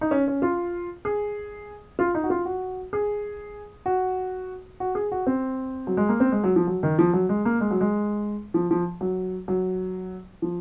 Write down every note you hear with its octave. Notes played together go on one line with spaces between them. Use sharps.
D#4
C#4
C#4
F4
G#4
F4
D#4
F#4
F4
F#4
G#4
F#4
F#4
G#4
F#4
C4
F#3
G#3
A#3
C4
G#3
F#3
F3
F#3
D#3
F3
F#3
G#3
A#3
G#3
F#3
G#3
F3
F3
F#3
F#3
F3